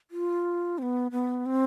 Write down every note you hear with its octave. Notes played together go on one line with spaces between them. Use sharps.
F4
C4
B3
B3
C4